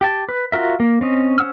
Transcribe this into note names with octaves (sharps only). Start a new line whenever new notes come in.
G4 G5 A5
B4
F4 F#4 A#4 E5
A#3
C4 C#4 D#5
C#4 C5 F#5 E6 F6